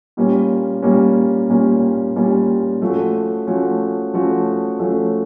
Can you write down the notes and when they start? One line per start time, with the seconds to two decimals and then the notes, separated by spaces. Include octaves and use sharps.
0.17 A#2 G3 A#3 C#4
0.82 A#2 G3 A#3 C#4
1.50 A#2 G3 A#3 C#4
2.16 A#2 G3 A#3 C#4
2.81 F3 A3 C#4 F#4
3.47 F3 A3 C#4 F#4
4.14 F3 A3 C#4 F#4
4.79 F3 A3 C#4 F#4